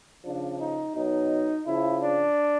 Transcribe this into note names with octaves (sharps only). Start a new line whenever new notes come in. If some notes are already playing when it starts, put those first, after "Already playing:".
C#3 F3 D4
D#4
B2 F#3 D#4
C#3 F3 E4
D4